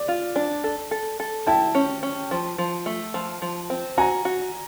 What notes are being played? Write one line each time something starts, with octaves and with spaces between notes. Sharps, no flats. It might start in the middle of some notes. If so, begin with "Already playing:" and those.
Already playing: D5
F4
D4
A4
A4
A4
E4 G5 A5
C#4
C#4
F3
F3
A3
F3
F3
C4
F#4 G#5 A#5
F#4